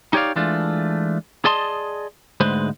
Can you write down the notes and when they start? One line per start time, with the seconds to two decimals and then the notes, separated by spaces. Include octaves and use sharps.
0.13 D#4 G4 C#5 D5 F5
0.36 E3 G#3 A3 D4 F4
1.45 G#4 D5 D#5 A5 C6
2.40 D2 G#2 G#3 B4 C5